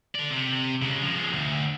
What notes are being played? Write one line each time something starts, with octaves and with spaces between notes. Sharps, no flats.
A4 D5
C3
C#3 G#3
F3 G#3
D2